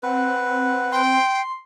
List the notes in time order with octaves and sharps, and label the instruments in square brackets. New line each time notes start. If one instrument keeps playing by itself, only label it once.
[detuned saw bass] C4 [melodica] B4 [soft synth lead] F#5
[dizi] G5 [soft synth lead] C6